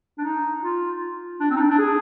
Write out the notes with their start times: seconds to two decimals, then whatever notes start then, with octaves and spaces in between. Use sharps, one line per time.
0.18 D4
0.24 D#4
0.63 F4
1.40 D4
1.51 C4
1.56 D#4
1.60 D4
1.70 D4
1.79 G#4